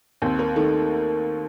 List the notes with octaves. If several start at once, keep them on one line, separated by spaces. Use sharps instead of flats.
D#2 C4
A#3
D#3 A3